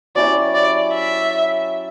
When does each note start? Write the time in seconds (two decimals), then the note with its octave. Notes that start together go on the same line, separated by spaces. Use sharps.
0.15 F#3 C#4 E4 G4 D5
0.54 D5
0.94 E5